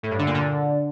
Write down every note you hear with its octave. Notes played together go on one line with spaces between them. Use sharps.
A2
G2
D3
A#2
D3